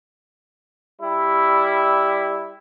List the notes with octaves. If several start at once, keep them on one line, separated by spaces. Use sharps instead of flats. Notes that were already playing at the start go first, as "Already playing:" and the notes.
G3 E4